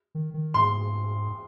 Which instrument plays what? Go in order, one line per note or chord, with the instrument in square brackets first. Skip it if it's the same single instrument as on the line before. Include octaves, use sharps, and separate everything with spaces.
[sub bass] D#3
D#3
[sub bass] G#2 [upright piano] C6